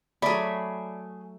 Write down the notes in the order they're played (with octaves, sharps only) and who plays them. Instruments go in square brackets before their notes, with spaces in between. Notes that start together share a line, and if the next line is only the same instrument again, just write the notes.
[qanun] F#3 A3 [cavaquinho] G#4 B5 [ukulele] D5